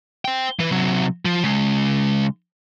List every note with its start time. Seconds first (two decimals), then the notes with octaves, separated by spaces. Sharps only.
0.25 C5 G5
0.59 E3 B4
0.71 C3 F#3
1.25 F3
1.44 C#3 G#3